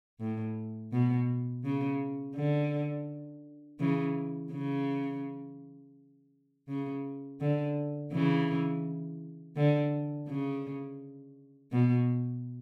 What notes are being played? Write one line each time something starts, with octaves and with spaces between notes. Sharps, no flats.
A2
B2
C#3
D3
C#3 E3
C#3
C#3
D3
C#3 E3
D3
C#3
B2